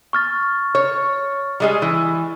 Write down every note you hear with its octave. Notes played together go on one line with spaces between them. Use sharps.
C#6 F6 A6
C#5
G3 G#3 G#4
E3